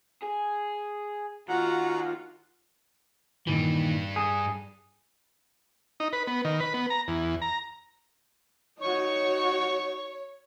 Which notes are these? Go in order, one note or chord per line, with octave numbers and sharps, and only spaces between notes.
G#4
D#2 D#3 F4 F#4 F#5 A#5
G2 A#2 D#3 E3 G3
G#4
D#4
B4
B3
D#3
B4
B3
A#5
E2
A#5
D#4 F#4 C#5 C#6